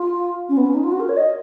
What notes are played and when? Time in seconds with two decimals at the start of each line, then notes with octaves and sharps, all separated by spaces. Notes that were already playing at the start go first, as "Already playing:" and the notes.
Already playing: F4
0.48 C#4
0.57 B3
0.66 C#4
0.74 D#4
0.83 F4
0.91 F#4
0.99 A#4
1.08 C#5
1.16 D#5